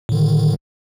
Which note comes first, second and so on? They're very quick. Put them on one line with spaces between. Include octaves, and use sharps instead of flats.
A2 D3 D#3